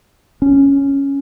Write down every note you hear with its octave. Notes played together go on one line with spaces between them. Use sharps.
C#4